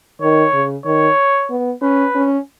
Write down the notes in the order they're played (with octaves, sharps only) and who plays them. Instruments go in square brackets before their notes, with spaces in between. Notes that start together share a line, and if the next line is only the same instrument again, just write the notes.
[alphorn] D#3 [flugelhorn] C#5
[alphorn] C#3
[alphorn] D#3 [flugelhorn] C#5
[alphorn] B3
[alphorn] C#4 [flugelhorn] B4
[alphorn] C#4